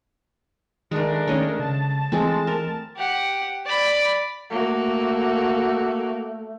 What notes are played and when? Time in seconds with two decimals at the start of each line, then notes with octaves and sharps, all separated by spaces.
0.91 D#3 G#3 A3 D4 A#4
1.28 D#3 A3 C#4 C#5 D#5
1.59 C#3 A5
2.12 E3 G#3 A3 C4
2.47 A#4
2.97 G4 F#5
3.66 D5 B5
4.50 A3 A#3 F#4